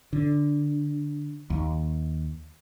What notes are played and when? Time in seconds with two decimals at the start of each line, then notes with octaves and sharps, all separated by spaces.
0.13 D3
1.50 D#2